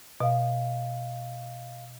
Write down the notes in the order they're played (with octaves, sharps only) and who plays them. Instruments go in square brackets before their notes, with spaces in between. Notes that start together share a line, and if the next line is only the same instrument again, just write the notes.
[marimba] B2 [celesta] D#5 F5